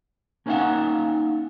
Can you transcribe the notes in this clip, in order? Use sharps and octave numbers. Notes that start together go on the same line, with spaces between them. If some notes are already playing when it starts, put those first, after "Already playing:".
A#3 C#4 D#4 D#5 F5 F#5